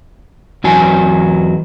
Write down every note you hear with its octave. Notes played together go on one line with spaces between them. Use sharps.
E2 F#3 G#5